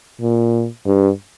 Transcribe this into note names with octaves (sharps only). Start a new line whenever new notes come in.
A#2
G2